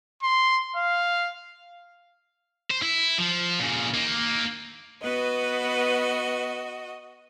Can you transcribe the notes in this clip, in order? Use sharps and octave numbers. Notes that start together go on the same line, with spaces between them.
C6
F5
C5
E4
F3
A#2 C#3
A#3 D#4
B3 F#4 B4 D#5